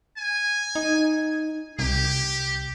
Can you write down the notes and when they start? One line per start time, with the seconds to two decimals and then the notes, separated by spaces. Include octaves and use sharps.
0.17 G#5
0.75 D#4
1.79 C2 G4